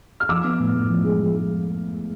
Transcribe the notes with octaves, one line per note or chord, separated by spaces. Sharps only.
F6
F3 D6 E6
B3
A2
A2
F3
G#3
F3
G#3